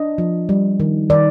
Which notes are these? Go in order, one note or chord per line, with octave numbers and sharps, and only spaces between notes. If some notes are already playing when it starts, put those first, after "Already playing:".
Already playing: D4 D#5
F3
G3
D#3
D#3 D5